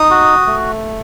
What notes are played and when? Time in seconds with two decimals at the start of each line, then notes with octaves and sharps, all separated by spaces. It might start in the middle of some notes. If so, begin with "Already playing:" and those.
Already playing: D#4 D#6
0.10 F#4
0.46 A3